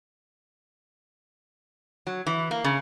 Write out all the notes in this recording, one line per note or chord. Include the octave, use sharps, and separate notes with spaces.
F#3
E3
A#3
C#3